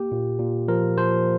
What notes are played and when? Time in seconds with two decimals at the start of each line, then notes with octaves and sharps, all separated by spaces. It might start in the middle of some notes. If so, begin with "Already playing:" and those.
Already playing: A#3 G4
0.12 A#2
0.39 A#2
0.68 F3 A#4
0.98 F3 C5